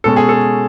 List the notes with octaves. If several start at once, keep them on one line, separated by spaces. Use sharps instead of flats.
B2 G#3 C#4 A4
G#4
A4